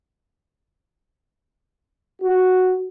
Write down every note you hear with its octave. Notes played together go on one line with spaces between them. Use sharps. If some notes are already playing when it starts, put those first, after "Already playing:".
F#4